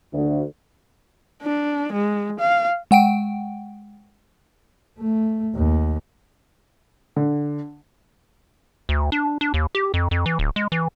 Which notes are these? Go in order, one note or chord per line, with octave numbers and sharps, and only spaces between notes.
D2
D4
G#3
F5
G#3 F#5 G5 D7
A3
D#2
D3
D2
D4
D4
D#2
G4
F2
F2
E3
D1
G#3
E3